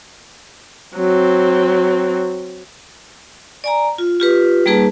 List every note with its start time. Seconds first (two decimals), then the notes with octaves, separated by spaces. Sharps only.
0.96 F#3 C4
3.64 D5 G#5 A#5
3.98 F4
4.20 F4 G4 B4
4.66 G3 A#3 D#4 G#4 B4 A5